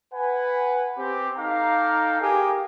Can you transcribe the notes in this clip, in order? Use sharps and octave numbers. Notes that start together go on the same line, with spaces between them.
B4 F#5 G#5
C4 G4
D#4 A4 F5 G5 A#5 D6
G4 G#4 A#4 G#5